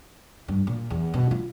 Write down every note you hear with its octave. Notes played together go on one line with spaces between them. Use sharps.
G2
A#2
E2
B2
F4